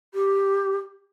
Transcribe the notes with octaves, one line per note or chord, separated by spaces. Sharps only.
G4